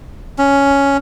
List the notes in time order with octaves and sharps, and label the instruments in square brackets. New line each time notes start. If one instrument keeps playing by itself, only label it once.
[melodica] C#4